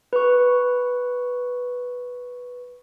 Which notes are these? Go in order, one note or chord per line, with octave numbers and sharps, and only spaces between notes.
B4 C#6